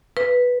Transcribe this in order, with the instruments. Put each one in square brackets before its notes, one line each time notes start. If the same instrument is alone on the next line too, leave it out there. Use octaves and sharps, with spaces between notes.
[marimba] B4